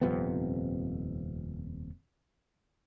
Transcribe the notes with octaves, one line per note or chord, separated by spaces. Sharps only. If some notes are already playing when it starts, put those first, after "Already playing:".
D#1 F2 C3 B3